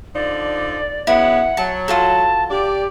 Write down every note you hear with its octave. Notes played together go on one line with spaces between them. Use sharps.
D3 F3 D#4 D5
C#3 F#3 B3 E4 F#5
F#3 A5
F4 F#4 A4 A5
G4 D5